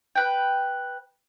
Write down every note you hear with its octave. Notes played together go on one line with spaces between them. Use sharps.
B4 G5